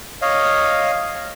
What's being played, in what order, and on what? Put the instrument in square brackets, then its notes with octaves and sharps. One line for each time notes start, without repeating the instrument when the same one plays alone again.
[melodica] C#5 D#5 F5